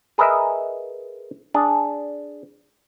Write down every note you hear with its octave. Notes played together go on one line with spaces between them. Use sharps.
G#4 A#4 B4 D#5 E5
D4 G#4